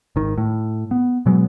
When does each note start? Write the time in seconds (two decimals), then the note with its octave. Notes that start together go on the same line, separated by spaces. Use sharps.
0.16 G#1 D#3
0.38 A2
0.91 B3
1.26 B2 F#3 G#3 B3